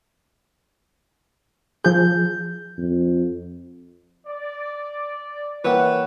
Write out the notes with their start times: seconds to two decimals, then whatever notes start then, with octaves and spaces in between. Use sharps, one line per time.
1.84 F3 G#4 G6
2.78 F2
4.27 D5
5.64 E3 A#3 B4 C#5 E5 F#5 G5